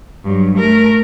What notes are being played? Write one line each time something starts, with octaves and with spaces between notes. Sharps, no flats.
G2 F#3
A3 A#4